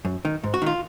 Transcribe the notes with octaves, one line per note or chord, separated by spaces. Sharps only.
F#2
D#3
G#2
F#4
D#3 F4